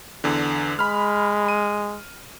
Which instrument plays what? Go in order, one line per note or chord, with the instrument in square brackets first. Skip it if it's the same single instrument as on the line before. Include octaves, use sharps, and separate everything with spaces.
[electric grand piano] E2 D3
[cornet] G#3 [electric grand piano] B5 F6
[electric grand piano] D#7